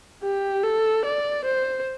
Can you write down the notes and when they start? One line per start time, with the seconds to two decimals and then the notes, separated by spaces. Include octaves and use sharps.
0.23 G4
0.63 A4
1.05 D5
1.45 C5